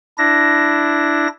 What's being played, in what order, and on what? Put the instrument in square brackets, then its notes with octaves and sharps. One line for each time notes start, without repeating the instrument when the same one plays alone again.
[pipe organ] D4 E4 A#6